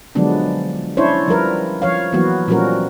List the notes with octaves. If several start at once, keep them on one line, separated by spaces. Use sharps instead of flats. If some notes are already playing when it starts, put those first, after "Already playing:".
D3 F3 F#3 G#3 B3 D4
C#4 D4 E4 C5 C#5
F3 G3 A#4 B4
F3 C#5 F5
E3 F#3 A#3 B3 F#4
A#2 F3 G3 C#4 F#4 A#4